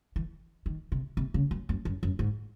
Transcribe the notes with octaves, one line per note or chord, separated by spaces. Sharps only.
E3
D#3
C3
C3
C#3
F#2
F#2
F#2
F#2
G#2